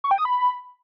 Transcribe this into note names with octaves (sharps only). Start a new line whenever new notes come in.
C#6
G5
D#6
B5